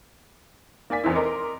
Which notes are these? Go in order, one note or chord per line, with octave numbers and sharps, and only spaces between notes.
A#3 D5 G#5 B6
F1 E2 C4 E4
A#4 D#5 C6 D6